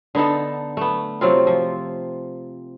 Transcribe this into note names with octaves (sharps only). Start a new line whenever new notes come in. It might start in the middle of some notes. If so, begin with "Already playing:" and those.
D3 B3 D#4 A4
A3 B3
C3 F#3 C4 F4
F3